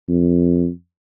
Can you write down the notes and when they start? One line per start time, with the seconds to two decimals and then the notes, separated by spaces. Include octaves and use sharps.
0.09 F2